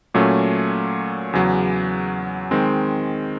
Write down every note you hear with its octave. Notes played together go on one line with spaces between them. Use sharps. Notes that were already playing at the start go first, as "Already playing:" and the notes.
A#2 F#3 A3 C#4
E2 C#3 F#3
D#3 G#3 C4